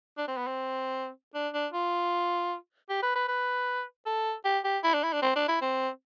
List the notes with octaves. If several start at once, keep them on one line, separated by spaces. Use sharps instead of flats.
D4
C4
B3
C4
D4
D4
F4
G4
B4
B4
B4
A4
G4
G4
E4
D4
E4
D4
C4
D4
E4
C4